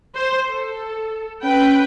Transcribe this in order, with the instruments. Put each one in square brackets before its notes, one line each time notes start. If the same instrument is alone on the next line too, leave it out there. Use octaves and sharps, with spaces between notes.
[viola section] C5
A4
[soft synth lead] C#4 [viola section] B4 G5